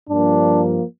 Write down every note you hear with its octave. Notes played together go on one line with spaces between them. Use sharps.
G2 F3 A#3 D4